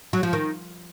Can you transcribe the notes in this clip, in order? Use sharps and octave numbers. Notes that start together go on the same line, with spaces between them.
F#3
F3
D#3